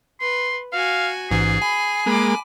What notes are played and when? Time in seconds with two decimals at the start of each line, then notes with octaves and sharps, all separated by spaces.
0.21 B4 C6
0.73 F#4 F5 G#5
1.31 A1 G#2 E3 G#4
1.62 G#5 B5
2.06 G#3 A#3 B5 D6